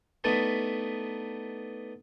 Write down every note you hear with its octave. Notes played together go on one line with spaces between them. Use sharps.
A3 B3 D4 D#4 A5